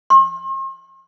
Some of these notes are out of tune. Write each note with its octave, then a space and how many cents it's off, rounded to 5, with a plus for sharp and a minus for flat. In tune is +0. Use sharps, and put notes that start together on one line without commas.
C6 +45